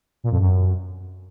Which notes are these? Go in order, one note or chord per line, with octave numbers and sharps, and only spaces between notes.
A#2
F2
F#2